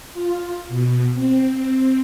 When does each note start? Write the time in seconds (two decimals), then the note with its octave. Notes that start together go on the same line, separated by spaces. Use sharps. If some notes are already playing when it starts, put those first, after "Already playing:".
0.14 F4
0.69 B2
1.14 C4